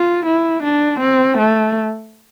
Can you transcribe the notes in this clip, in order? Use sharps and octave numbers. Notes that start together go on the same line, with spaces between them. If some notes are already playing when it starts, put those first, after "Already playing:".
Already playing: F4
E4
D4
C4
A3